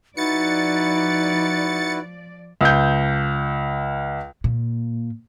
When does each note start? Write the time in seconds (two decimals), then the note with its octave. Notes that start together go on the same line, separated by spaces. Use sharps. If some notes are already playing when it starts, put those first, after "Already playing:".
0.17 F3 D#4 E4 F#4 B4 D5 A6 C#7
2.61 C#2 G6
4.44 A#2